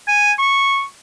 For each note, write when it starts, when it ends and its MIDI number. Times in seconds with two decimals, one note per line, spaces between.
0.08 0.32 80
0.39 0.83 85